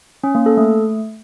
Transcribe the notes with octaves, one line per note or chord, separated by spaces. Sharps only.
C#4
A#3
A4
A3